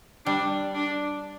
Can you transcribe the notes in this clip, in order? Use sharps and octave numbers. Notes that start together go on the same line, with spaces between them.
G3 D4
D4